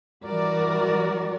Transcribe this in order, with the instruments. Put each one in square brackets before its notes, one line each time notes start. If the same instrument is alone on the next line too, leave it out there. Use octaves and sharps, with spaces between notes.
[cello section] E3 G3 F#4 A#4 D5